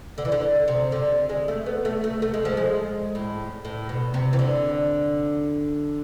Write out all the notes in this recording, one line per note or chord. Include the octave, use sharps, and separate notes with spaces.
D3
E3
D3
C3
D3
G#3
A3
B3
A3
A3
A3
G#3
F3
G#3
A2
A2
B2
C3
E3
D3